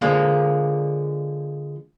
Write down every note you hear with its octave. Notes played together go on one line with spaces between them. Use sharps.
D3 F3 G#3 A#3